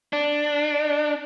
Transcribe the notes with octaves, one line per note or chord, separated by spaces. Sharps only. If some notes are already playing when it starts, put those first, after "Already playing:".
D4